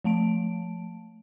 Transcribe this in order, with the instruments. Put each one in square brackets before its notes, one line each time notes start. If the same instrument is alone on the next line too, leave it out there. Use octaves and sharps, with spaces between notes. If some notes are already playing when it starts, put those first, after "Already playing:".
[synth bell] F3 A3 A5 D7